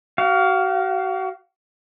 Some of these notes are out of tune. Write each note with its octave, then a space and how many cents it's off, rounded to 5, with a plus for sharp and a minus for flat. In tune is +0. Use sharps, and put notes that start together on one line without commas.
F#4 +35 F5 +0